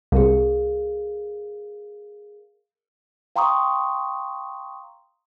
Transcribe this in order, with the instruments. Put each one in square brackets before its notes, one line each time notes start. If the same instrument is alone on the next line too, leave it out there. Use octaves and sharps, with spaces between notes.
[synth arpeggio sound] C2 [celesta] G#4 A#4 F5
[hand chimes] F5 G5 A#5 C6 C#6 D#6